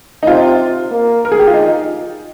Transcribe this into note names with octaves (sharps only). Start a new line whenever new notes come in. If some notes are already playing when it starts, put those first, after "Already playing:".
D#4
C3 F4
A#3
A#4
G#4
G4
F4
D#4